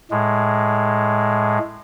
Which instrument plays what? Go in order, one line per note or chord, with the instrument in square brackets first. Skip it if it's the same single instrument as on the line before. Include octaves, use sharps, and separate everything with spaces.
[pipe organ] A2 G#3